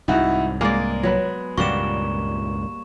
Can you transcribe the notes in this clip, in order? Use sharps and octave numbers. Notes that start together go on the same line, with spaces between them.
C2 G#2 D#4 E4 F#4
G#3 A#3 D5
F#3 B3 B4
C#2 G2 A#2 G3 A#3 F#4 C#6 E7